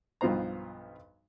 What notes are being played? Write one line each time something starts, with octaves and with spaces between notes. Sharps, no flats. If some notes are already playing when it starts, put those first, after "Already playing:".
B1 G2 F3 B3 C5 A#5